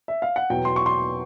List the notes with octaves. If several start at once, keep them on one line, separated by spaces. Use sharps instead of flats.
E5
F5
F#5
E2 B2 F#3 G5
C6
C#6
C6